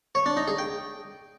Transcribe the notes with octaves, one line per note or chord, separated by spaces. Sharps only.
C#5
D4
D#4
G#4
G5